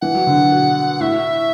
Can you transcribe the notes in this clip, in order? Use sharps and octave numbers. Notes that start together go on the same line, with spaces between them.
E3 F#5
F#3
D3
B2
A2 E5